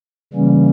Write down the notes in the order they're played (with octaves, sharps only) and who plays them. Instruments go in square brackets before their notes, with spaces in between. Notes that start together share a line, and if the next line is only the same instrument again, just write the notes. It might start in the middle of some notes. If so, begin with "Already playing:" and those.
[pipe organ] C#3 E3 G3 A#3 C#4